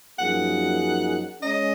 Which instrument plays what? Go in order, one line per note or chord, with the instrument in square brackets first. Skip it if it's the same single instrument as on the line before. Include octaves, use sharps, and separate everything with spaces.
[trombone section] F#2 F3 A#3 D#4 G#4 [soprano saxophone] F#5
[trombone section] G#3 C#4 [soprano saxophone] D#5